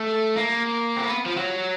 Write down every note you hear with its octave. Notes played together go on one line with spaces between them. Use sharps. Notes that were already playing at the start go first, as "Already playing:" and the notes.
Already playing: A3
A#3
C4
B3
F3
F#3